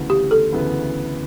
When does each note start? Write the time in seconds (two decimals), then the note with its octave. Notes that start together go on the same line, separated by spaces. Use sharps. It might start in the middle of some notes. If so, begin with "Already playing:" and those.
Already playing: D2 C#3 E3 B3
0.10 G4
0.31 A4
0.53 D2 C#3 E3 B3